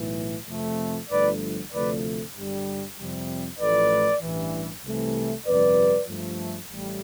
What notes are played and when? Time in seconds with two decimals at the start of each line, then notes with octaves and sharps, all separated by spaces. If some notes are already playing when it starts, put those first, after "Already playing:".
Already playing: B1 A2 E3
0.48 F2 C3 F3 A3
1.10 G1 G2 F3 A3 B4 D5
1.73 D2 C3 F3 A3 B4 D5
2.36 G1 G2 D3 G3
2.98 F2 C3 G3
3.59 A1 A2 F3 A3 B4 D5
4.22 A1 G2 E3
4.84 C2 C3 E3 A3
5.45 G1 F2 C3 G3 B4 D5
6.08 G2 F3 A3
6.70 A1 A2 G3